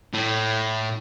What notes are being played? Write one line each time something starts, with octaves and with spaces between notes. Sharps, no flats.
A2